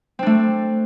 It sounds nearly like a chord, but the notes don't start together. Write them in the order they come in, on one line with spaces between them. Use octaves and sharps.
C4 D4 A3